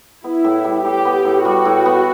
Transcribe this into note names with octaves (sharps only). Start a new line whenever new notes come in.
B3 E4
A2
G3
A2 G4
B3
A2
G3 F#4
A2
B3